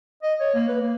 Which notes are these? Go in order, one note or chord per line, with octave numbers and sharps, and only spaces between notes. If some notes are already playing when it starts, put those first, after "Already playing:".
D#5
C#5
A#3
B4
A#3